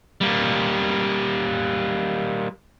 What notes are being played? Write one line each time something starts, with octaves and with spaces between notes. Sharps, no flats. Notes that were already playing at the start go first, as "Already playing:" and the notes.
G3 A#3